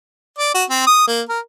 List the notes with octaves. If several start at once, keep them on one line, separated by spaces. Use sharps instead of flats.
D5
F#4
C4
D#6
A#3
A#4